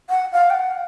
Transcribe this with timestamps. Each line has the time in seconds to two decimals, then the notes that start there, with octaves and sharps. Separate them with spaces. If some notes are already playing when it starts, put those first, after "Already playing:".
0.10 F#5
0.33 F5
0.50 G5
0.54 F#5